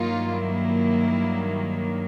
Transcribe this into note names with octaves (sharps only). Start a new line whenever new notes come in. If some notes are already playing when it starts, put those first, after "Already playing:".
Already playing: G2 D#3 F#3 A#3 D#4 F4
E4